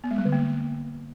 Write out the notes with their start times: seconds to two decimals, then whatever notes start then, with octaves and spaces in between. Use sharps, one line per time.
0.04 B3
0.11 G#3
0.18 G3
0.25 D3
0.32 A#3